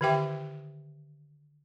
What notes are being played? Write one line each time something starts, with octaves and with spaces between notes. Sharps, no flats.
D3 D#3 G4 E5 G5 D6